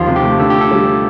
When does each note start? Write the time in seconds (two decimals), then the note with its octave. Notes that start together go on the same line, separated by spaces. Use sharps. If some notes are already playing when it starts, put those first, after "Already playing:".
Already playing: D#2 F3 F4
0.08 C3
0.16 G4
0.23 A3
0.39 D3 A4
0.50 D3 G4
0.61 A4
0.71 G3